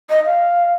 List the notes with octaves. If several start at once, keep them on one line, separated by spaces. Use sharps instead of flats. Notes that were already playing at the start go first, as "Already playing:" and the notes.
D#5
F5